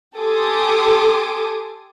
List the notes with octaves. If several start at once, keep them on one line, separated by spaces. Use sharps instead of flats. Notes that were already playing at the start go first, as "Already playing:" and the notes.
G4 A4 G#5 C6 D6 D#6